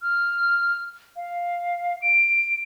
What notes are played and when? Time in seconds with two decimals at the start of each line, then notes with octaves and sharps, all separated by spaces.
0.02 F6
1.16 F5
2.02 D7